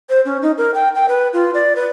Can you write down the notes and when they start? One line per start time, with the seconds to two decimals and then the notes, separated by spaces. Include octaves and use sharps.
0.09 C5
0.25 C#4
0.42 D#4
0.58 A#4
0.74 G5
0.95 G5
1.08 B4
1.33 F4
1.54 D5
1.76 B4